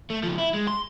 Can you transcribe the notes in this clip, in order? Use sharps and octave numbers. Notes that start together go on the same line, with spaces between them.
A3
C#2 F3
E4
G#3
C6